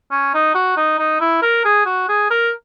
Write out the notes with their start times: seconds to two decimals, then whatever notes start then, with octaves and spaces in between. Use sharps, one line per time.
0.11 C#4
0.34 D#4
0.55 F#4
0.77 D#4
0.99 D#4
1.21 E4
1.42 A#4
1.65 G#4
1.86 F#4
2.09 G#4
2.30 A#4